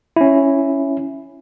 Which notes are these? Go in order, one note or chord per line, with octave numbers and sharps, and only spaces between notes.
C#4 E4